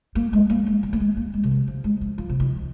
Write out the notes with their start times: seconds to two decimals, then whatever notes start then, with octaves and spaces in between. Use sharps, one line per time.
0.15 A#3
0.33 G#3
0.49 A#3
0.66 G#3
0.83 D#3
0.93 A#3
1.00 G#3
1.17 A#3
1.34 G#3
1.43 C3
1.51 D#3
1.68 F3
1.84 G#3
2.01 F3
2.18 F3
2.29 C3
2.40 D#3